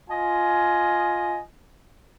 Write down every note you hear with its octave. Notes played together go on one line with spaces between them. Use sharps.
F4 D#5 G#5